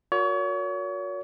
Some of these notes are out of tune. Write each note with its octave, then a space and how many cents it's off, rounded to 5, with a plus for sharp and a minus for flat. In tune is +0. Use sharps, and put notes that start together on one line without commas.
F#4 -35 A#4 -5 C#5 +35